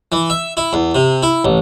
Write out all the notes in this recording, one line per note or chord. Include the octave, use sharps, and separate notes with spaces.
E3
E5
E4
E2
C3
E4
A1